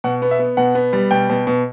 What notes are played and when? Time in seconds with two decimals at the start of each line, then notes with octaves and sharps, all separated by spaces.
0.04 B2 F#5
0.22 B3
0.31 E5
0.39 B3
0.57 B2 F#5
0.75 B3
0.93 G3
1.11 B2 G5
1.30 B2
1.47 B2